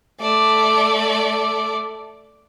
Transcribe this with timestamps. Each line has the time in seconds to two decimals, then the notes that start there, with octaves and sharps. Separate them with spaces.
0.20 A3 D5